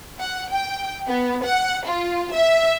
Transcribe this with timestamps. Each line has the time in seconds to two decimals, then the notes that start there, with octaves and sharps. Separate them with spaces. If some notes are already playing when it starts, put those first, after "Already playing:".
0.19 F#5
0.50 G5
1.08 B3
1.45 F#5
1.87 F4
2.34 E5